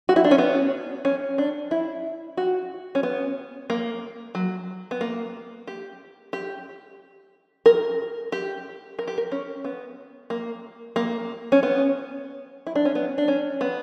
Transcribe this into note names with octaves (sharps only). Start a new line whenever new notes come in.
F#4
E4
D4
C#4
B3
C#4
D4
E4
F#4
C#4
B3
A#3
F#3
B3
A#3
G4
G4
A#4
G4
A#4
G4
A#4
C#4
B3
A#3
A#3
C#4
B3
E4
D4
C#4
B3
D4
C#4
B3